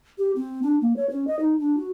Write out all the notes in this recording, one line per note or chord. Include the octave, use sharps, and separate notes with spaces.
G4
C4
D4
A#3
C#5
C#4
D#5
D#4
D4
F#4